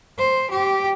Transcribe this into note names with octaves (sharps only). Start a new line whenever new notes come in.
C5
G4